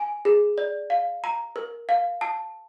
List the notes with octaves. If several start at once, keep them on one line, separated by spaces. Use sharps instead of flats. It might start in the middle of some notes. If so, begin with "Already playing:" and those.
Already playing: G#5
G#4
D5
F5
A#5
A#4
F5
A5